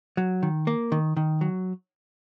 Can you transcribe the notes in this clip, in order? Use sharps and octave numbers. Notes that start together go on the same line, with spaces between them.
F#3
D#3
A#3
D#3
D#3
F#3